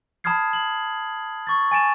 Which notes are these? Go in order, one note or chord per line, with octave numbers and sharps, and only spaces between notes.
A5 B5 D#6 F6 G#6 C7
F#7
C#6 A6
G#5 A6 D7 E7